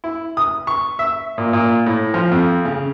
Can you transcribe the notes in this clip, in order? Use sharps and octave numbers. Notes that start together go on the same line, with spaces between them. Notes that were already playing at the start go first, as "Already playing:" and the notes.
E4
D#6
C#6
E5
A#2
A#2
A2
F3
F2
C#3